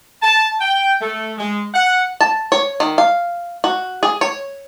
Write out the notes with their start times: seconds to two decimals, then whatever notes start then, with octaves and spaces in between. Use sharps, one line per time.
0.22 A5
0.60 G5
1.01 A3
1.38 G#3
1.74 F#5
2.21 A5
2.52 C#5
2.80 D#3
2.98 F5
3.64 F#4
4.03 G#4
4.21 C#5